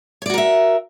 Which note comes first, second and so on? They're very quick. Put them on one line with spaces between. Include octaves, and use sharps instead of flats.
C#5 D5 F#4 A#4 E5